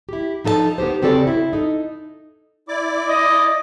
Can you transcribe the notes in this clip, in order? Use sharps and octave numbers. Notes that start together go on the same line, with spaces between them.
E4 G4
F3 D#4 A4 D#5 A5
B3 D#4 G4 C5
C#3 C4 F#4 G4 A4 D5
E4
D#4 A4
E4 D5 D6
D#5